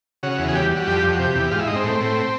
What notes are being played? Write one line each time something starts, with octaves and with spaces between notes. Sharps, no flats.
C#3 F#4
E2
G#4
G3 G4
G3
F#4
F2 G4
F2
F#4
C3 G4
E2
G#2 F4
E4
G#2 D#4
C4
A2
A2